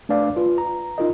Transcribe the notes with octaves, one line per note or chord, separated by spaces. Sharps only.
A3 D4 B4 D5 F5
F4 B4
A#5
D#4 F4 A#4 D#5